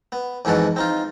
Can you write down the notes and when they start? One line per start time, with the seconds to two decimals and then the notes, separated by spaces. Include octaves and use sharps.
0.12 B3
0.45 F2 G#2 B2 E3 A4 F#5
0.76 C4 D#4 F4